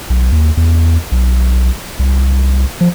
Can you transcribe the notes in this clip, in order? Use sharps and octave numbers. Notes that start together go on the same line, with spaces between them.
B1
D#2
E2
B1
C2
F3